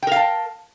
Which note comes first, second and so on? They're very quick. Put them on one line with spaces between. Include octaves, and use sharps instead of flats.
G5 A#4 F5 A5